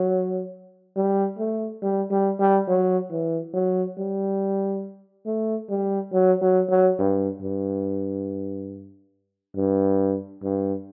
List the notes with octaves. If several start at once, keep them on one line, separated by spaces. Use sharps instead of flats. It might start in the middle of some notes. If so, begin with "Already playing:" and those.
Already playing: F#3
G3
A3
G3
G3
G3
F#3
E3
F#3
G3
A3
G3
F#3
F#3
F#3
G2
G2
G2
G2